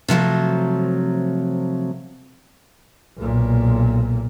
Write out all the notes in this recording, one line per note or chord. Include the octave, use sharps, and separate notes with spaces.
C3 F3 F#3 A3
B1 A#2